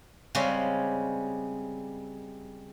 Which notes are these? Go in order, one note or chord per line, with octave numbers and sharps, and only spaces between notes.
C#3 G3 G#3 C4 C#4